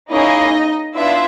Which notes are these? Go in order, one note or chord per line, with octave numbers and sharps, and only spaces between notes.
A#3 C#4 D#4 E4 G#4 D#5
B3 D4 E4 F4 E5